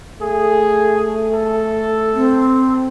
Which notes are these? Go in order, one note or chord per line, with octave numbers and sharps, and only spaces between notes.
A3 G#4
A4
C4